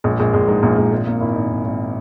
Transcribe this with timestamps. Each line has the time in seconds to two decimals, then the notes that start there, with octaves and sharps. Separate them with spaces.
0.04 A#1 G#3
0.19 A#1 G#3
0.33 A#1 G#3
0.48 G#2 G#3
0.63 A#1 A#3
0.77 A#1 G#3
0.92 G#1 G#3
1.06 G#1 A#3
1.20 G#1 E4
1.35 G#1 D#4
1.50 G#1
1.65 G#1